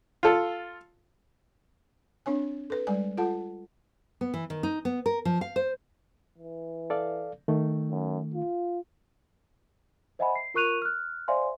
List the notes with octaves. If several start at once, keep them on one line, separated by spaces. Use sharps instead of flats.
F4 A4
C4 D4 C#5 G#5
A4 B4
G3 G#3 D5 G#5
F4 A4 F#5 A5
B3
E3
D#3
D#4
B3
A#4
F3
F5
C5
E3
A4 D5 F5
D#3 A3
F#2
F4
C5 D#5 E5 F#5 G#5 B5
C7
F4 A#4 C#6 F#6 D#7 F7
F6 F#6
C5 D5 E5 F5 G#5 C6